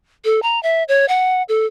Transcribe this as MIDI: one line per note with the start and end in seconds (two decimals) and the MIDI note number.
0.25 0.40 69
0.43 0.61 82
0.63 0.83 76
0.88 1.06 73
1.08 1.43 78
1.49 1.66 69